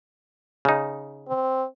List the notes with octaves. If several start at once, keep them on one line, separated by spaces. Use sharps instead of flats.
C#3 D#4
C4